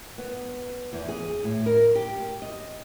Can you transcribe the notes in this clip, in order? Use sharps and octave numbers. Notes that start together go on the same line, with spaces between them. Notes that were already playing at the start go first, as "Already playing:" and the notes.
B3
E2
G#4
A2
A#4
G4
D#5